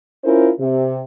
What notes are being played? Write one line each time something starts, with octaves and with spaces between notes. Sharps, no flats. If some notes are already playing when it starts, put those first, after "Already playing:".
C#4 E4 F4 A#4 C5
C3